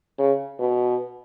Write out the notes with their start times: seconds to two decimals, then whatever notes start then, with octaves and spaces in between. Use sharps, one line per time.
0.19 C#3
0.59 B2